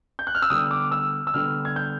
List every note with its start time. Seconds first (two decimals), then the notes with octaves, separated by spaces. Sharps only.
0.19 G6
0.27 F#6
0.35 F6
0.42 E6
0.50 D3 G3 B3 D#6
0.71 D6
0.92 E6
1.27 E6
1.34 D3 G3 B3 F6
1.65 G#6
1.76 G6